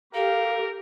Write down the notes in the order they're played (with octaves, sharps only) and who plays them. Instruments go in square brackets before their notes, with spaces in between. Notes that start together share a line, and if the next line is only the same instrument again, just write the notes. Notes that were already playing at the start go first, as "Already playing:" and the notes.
[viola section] G4 [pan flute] A4 [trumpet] A#4 [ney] F5